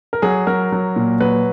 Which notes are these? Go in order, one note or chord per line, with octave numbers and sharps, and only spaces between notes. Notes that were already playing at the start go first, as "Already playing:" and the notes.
A#4
F#3 G#4
F#3 A#4
F#3
A#2
F#3 B4